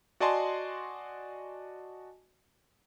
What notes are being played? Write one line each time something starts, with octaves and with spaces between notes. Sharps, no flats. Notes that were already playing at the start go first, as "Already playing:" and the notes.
F#4 D5 D#5 G#5 A5 C6